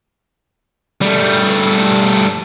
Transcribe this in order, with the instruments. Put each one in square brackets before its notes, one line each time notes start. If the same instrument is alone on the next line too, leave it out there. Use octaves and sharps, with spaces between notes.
[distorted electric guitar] G3 A3